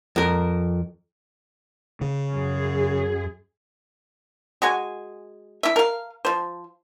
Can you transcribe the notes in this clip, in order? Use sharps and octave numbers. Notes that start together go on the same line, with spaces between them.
F2 A#4
C#3
F#2 G#4
G#3 F#4 G#5
E4 E5
A#4 F5
F3 C5